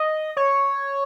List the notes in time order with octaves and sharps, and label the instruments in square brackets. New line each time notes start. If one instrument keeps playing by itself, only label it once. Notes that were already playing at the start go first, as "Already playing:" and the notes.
Already playing: [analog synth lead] D#5
C#5